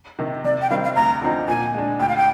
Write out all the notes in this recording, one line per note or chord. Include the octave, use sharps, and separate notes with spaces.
C3 D#3
C3 D5
G5
D#3 G3 C4 F5
F5
D2 A#5
D3 F3 C4 D#4
A#2 G#5
G#3 D4
D2 G5
F5
G5